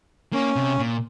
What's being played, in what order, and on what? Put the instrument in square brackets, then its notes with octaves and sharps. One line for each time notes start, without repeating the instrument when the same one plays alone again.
[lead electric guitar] A#3 [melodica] C#4
[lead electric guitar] C3
A#2